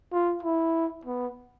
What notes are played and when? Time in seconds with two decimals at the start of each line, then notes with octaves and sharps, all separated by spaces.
0.12 F4
0.43 E4
1.05 B3